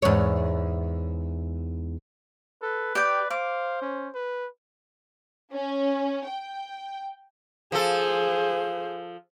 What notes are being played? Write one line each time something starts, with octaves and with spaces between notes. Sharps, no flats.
E2 G#2 C#5
A4 B4
G4 D5 G5
C5 F5 D6
C#4
B4
C#4
G5
F3 G#4 A4 C5